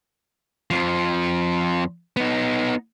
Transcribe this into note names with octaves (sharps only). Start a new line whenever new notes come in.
F2 F3
B3 D#4